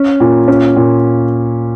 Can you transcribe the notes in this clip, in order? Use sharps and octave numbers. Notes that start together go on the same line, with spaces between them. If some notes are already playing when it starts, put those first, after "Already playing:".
Already playing: C#4
A#2
C#4
A#2